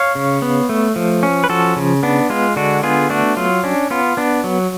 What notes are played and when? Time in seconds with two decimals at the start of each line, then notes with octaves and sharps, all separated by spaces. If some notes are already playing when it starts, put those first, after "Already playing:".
Already playing: C#5 F5
0.15 C#3
0.42 B3
0.69 A3
0.96 F3
1.23 C#4
1.44 B4
1.49 F3 F#4 A4
1.76 C#3
2.03 B3 D4
2.30 G#3 F4
2.56 D3 D4 F#4
2.83 B3 F4 G#4
3.10 A3 D4 F#4
3.37 F#3 F4
3.63 C#4 D4
3.91 B3 F4
4.17 B3 D4
4.44 F#3